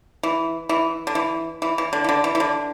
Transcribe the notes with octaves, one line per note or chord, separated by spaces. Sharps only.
E3
E3
D3
E3
E3
E3
D3
E3
D3
E3
E3
D3